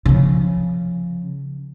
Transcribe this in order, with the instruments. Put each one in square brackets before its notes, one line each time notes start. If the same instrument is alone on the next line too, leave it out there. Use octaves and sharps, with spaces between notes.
[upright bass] C#3 F3